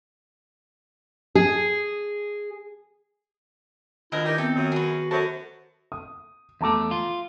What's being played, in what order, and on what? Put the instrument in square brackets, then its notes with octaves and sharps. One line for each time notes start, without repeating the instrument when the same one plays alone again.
[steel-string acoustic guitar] G#4
[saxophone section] D2 C4 A#4 [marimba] D#3 F4 [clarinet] E4 [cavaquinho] D#5
[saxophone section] E3 G4 [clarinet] D#4 [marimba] A#4 D5
[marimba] B3 E5 [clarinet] C4 [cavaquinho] A4
[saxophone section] F#2 [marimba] D#3
[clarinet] F#4 [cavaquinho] G#4 B4
[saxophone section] F#2 [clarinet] F#4 [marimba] A4 C5 [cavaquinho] A5
[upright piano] D#6
[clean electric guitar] E2 A3 [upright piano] A5 A#5 D6
[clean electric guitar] F4